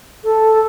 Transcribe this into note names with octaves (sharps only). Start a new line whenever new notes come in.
A4